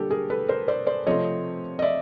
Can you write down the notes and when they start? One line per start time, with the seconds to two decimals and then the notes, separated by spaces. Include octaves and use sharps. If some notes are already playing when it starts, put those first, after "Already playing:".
Already playing: D3 G3 A#3 D4 G4 A4 A#4
0.11 G#4 A#4
0.30 A4 B4
0.49 A#4 C5
0.68 C5 D5
0.87 C5 D5
1.07 C3 F3 A3 C4 C#5 D#5
1.79 D#5
1.82 D5 E5